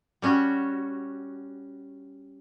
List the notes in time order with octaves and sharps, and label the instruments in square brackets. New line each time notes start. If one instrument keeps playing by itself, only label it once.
[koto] G3 C#4 F#4